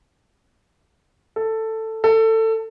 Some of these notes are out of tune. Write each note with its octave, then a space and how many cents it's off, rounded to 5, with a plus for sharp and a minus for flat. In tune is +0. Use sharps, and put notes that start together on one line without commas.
A4 +10
A4 +20